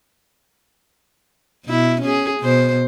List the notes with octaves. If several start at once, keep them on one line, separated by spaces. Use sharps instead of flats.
B2 E4
C#4 G#4
B2 C5